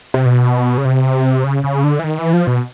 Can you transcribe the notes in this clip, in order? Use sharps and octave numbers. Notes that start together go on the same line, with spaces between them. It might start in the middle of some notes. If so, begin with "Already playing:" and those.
C3
B2
C#3
C3
C#3
C#3
D3
E3
D#3
E3
F3
B2